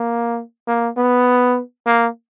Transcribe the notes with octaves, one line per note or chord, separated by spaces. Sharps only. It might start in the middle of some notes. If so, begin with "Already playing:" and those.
Already playing: A#3
A#3
B3
A#3